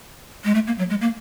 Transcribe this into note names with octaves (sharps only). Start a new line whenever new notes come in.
G#3
A3
A#3
F#3
G#3
A#3